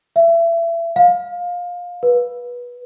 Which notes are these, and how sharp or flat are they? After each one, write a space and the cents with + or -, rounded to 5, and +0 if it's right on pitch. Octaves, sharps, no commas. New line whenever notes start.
E5 +30
F5 +20
B4 -20